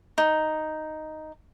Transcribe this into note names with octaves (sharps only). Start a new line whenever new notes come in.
D#4